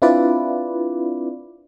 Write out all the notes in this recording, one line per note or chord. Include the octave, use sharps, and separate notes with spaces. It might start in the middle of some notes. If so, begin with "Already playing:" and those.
C4 D4 E4 F4 B4 D5